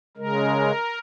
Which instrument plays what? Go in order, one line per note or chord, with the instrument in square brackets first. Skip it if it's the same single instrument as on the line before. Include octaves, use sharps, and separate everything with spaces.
[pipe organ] C#3 G#3 A#4